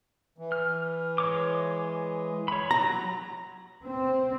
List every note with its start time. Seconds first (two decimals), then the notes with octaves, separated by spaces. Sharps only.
0.38 E3
0.52 F6
1.18 G#3 C#5 D6
2.48 C#5 B5
2.71 F#3 A#5
3.84 C4